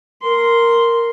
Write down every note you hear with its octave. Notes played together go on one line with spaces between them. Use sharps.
A#4 C6